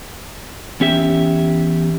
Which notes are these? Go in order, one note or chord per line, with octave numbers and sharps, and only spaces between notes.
E2 C#4 G4 E5